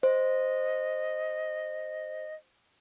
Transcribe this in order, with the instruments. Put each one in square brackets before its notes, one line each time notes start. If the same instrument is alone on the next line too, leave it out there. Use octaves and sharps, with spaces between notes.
[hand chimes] C5 [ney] D#5